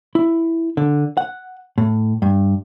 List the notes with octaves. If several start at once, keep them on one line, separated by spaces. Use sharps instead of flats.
E4
D3
F#5
A2
G2